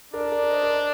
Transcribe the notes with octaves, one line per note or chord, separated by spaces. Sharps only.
D4 A#4 D5
A#4 D5
C5 D#5
A#4 D5